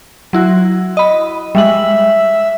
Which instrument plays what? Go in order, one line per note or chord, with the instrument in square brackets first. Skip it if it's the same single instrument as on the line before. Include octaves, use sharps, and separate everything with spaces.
[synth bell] F#3 E4 F#4
D#5 B5
[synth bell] G3 G#3 F#7 [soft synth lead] E5